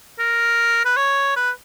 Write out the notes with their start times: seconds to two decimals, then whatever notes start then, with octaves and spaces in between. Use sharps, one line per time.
0.19 A#4
0.85 B4
0.97 C#5
1.36 B4